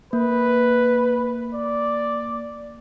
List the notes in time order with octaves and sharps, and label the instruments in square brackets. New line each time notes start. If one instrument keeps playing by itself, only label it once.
[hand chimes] A#3 [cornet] B4
[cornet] D5